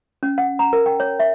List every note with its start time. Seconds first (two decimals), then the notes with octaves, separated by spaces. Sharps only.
0.23 C#4
0.38 F#5
0.59 A#5
0.73 A#4
0.86 G5
1.00 C#5
1.20 E5